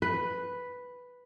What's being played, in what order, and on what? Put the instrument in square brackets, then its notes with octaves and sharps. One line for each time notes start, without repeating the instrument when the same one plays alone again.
[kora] B4